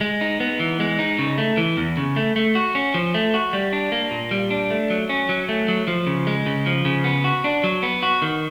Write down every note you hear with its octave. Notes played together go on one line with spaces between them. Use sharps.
G#3
D#4
B3
E3
G#3
D#4
C#3
A3
E3
E2
C#3
A3
A3
F#4
C#4
F3
A3
F#4
G3
D4
A#3
A#2
G3
D4
A3
F#3
C#4
F#3
A3
F#3
F3
C#3
G#3
C#3
F3
C#3
B3
F#4
D4
F#3
B3
F#4
D#3